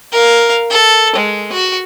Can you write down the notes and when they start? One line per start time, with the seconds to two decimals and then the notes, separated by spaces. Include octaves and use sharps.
0.12 A#4 F5
0.70 A4
1.16 G#3
1.52 F#4